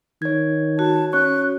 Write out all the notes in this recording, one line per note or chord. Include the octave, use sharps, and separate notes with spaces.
D#3 C#5 G#6
F#4 A5
C#4 C#5 C#6 F#6